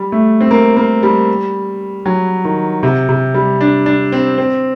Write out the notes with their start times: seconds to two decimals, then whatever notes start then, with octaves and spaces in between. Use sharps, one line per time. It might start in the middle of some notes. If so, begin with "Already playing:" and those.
Already playing: G3
0.12 A3
0.41 C4
0.51 A#3
0.77 A#3
1.03 G3
2.06 F#3
2.45 D#3
2.83 C3
3.09 C3
3.34 G3
3.61 D4
3.86 D4
4.12 C4
4.38 C4